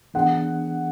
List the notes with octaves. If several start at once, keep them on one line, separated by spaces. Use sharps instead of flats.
E3 B3 D4 G#4 F#5